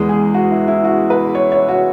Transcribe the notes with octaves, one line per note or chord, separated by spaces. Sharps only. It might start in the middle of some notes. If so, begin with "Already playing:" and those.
Already playing: E2 E3 G#3 B3
G#4
F#4
E4
E4
F#4
B4
C#5
C#5
F#4